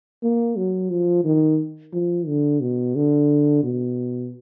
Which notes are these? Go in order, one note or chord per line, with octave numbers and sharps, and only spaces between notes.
A#3
F#3
F3
D#3
F3
D3
B2
D3
B2